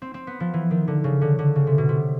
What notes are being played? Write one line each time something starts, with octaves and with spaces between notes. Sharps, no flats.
C4
C4
B3
F3
E3
D#3
D3
C#3
D3
D3
C#3
C3
B2
C3